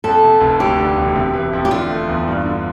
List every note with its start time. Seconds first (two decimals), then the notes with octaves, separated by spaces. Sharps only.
0.04 F2 A4
0.23 C3
0.41 F1
0.60 D2 G4
0.79 D3
0.97 E1
1.16 C3
1.34 E3
1.53 F2
1.65 G4
1.71 D3 F4
1.89 A3
2.09 E2
2.28 G2
2.46 D3